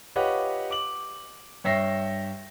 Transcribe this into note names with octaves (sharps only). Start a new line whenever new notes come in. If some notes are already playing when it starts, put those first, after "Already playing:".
F4 G4 B4 C#5 D#5 F#5
D6 F#7
G2 C#5 E5 G5 A#6 C7